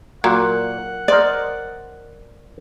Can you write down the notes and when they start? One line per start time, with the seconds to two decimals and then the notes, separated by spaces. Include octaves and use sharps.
0.24 A#2 F#3 A#3 F#5
1.08 A#4 C5 D5 D#5